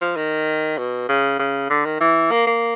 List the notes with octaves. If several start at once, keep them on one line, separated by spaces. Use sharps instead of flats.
F3
D#3
B2
C#3
C#3
D3
D#3
E3
A#3
A#3